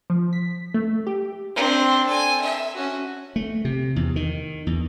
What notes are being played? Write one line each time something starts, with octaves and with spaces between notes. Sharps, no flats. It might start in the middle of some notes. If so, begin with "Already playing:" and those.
F3
B6
A3
G4
C4 D4
A4 G#5
E5
C#4 F#4
A3
C3
E2
D#3
E2